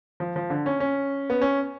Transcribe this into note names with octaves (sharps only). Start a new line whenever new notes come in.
F3
F3
D3
C#4
C#4
B3
C#4